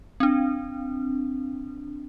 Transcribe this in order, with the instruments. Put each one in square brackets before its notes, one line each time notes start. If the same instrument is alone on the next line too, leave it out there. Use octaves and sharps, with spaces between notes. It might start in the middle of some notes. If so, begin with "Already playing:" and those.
[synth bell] C4 D4